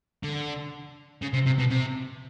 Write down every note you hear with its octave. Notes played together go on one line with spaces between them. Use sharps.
D3
C#3
C3
C3
B2
C3